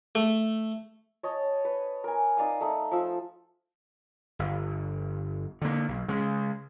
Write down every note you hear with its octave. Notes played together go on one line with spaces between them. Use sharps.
A3
C#5 D#5 A5
B4
A#4 G#5
D#4 D5 F5 D#6
A3 D#4
F3 E6
G1
D3 A#3
B1
C#3 G#3